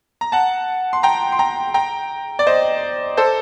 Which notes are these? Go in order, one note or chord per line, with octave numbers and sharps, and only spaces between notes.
A#5
F#5 A5
C6
G5 A#5
C6
G5 A#5
G5 A#5
D5
C5 D#5
A4 C5